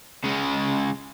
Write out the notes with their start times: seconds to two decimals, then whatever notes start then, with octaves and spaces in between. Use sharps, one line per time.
0.24 C#3 G#3